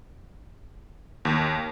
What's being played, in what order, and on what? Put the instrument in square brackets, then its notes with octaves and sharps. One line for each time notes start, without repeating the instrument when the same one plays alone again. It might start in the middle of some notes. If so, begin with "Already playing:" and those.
[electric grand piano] D#2